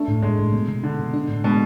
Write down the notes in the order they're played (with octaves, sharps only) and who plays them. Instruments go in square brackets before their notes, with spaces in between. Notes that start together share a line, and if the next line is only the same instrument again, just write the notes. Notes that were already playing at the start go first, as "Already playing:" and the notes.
Already playing: [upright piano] A3 [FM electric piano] D4
[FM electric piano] A2
[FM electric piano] A2 [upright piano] G#3
[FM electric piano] A2
B2
B2
[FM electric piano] B2 [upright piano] D3
[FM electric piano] B2
D4
A2
[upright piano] B2 [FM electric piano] G#3